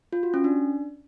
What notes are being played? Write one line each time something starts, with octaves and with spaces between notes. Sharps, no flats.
F4
F#4
C#4
D4